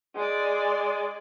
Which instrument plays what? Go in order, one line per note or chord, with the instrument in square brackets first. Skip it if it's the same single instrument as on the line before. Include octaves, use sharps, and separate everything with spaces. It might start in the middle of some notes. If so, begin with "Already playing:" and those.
[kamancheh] G#3 D5